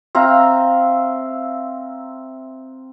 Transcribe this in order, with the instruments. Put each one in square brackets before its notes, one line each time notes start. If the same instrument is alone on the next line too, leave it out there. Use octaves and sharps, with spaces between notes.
[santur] C4 E5 F5 A#5